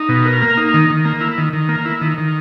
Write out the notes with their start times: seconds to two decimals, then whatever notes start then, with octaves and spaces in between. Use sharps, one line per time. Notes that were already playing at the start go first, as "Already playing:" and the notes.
Already playing: D#4
0.09 B2
0.25 A#4
0.42 A#3
0.57 D#4
0.74 D#3
0.90 D#3
1.05 A#3
1.21 E4
1.38 D#3
1.53 D#3
1.69 A#3
1.85 E4
2.01 D#3
2.18 D#3